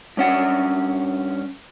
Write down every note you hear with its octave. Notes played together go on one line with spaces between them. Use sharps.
G2 C#4 F#5